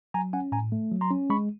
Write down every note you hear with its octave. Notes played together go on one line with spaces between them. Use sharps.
F#3 G#5 A#5
C#4 F#5 G#5
A2 G#5 A#5
A3
F#3
A#5 C6
C#4
G#3 B5 C#6